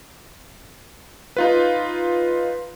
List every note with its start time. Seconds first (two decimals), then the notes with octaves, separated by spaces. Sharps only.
1.37 D#4 F4 B4